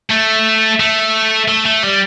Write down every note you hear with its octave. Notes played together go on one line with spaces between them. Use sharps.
A3
A3
A3
A3
G3